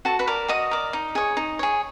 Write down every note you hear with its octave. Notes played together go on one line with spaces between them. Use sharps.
F#4 A4 A5
B4 B5
A#4 D5
F#4 D#5 D#6
A#4 D5
D#4
G#4 C#5
D#4
G#4 C#5